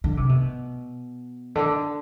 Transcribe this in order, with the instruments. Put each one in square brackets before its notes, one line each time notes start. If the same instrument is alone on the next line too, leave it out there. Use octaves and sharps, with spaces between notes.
[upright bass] D3
C3
B2
D3